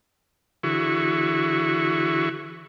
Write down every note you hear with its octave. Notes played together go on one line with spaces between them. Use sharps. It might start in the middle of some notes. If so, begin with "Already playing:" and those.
D3 E3 E4 F#4 G#4 C#6